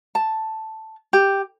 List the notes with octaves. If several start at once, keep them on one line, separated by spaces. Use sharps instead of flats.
A5
G4